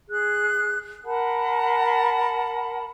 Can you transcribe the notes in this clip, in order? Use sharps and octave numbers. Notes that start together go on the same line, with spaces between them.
G#4 F#6
A#4 F#5 A5 B5